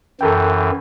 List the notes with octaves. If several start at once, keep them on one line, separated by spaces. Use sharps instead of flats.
F#2 E3 A4 A#4 G5